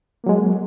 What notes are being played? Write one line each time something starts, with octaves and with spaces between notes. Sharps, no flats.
F#3 G#3 A#3